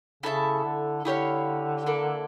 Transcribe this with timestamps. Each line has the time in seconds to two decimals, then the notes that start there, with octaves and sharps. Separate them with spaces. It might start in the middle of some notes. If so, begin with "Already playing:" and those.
0.23 C#3 E4 A4 E5 A5
0.64 D3
1.05 D3 E4 G4 C#5 F5
1.86 A#3 E4 A4 D5